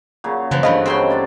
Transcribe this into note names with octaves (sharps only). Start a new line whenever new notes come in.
A#2 C#3 F#3
F#2 C#3 E3 F3 B4
G2 E3 A3 D#5 F5 B5
C#3 F#3 C4 C#4 G5 C6
C#4 F4 D5